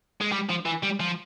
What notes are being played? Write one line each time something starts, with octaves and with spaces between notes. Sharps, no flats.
G#3
G3
F3
E3
G3
F3